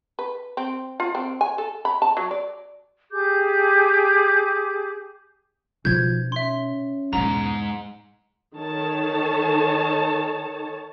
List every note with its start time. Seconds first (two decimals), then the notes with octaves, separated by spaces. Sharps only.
0.19 B4
0.57 C4
1.00 F4
1.15 C4
1.41 G#5
1.58 A4
1.85 B5
2.02 A5
2.17 F#3
2.31 D5
3.12 G4 G#4 D6 G6
5.85 B2 F3 D#4 G6 G#6
6.32 C#4 E5 C6
7.13 E2 G#2 B2 A#5
8.56 D#3 A4 C#5 A5